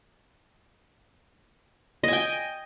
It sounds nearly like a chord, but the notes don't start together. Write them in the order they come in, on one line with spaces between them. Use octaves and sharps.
D#5 G#5 G5